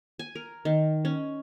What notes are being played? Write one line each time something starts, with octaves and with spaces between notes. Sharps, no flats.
G#5
A#4
D#3
C#4